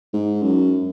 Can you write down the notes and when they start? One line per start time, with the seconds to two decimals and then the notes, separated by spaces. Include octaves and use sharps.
0.13 G#2
0.43 F#2